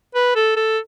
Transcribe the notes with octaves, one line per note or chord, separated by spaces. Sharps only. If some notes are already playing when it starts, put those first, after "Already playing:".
B4
A4
A4